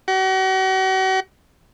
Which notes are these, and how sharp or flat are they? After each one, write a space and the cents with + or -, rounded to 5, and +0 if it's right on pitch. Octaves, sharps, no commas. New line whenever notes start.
F#4 +40